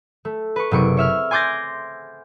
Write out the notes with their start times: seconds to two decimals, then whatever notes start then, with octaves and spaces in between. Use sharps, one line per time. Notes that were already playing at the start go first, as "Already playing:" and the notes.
0.25 A3
0.56 B4 C#6
0.71 F#1 C3 C#6 D7
0.97 C#5 E5 F6
1.31 G#5 C6 D6 G6 A6 A#6